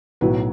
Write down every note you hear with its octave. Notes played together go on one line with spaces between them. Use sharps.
B1 A2 F#3 B4